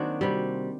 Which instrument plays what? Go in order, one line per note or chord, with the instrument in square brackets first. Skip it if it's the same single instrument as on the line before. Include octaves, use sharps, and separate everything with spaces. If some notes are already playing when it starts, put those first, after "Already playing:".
Already playing: [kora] D#3 F#3 A#3 C4 D4 F#4
C3 G3